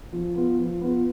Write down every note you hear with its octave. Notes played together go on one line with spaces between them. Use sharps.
F3
B3 F4
F3
B3 F4